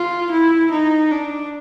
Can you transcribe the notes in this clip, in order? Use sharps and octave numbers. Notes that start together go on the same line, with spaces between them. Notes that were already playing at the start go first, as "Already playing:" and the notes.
Already playing: F4
E4
D#4
D4